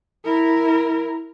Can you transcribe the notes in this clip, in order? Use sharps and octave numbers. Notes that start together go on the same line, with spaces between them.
E4 A#4